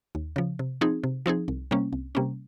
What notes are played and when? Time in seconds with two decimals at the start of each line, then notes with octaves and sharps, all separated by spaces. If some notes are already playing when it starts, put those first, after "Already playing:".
0.15 D#2
0.36 C#3 F3
0.59 C3
0.81 F3 C4 D#4 G#4
1.04 C3
1.26 F3 C4 D#4 G#4
1.48 C2
1.71 C3 G3 A#3 C#4
1.93 C2
2.15 C3 G3 A#3 C#4